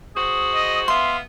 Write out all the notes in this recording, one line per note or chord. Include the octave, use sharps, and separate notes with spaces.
F#4 G#4 C5 D#6
D#5
B3 E5 F5 C6